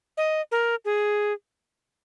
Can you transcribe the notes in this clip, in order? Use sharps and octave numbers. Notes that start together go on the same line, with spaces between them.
D#5
A#4
G#4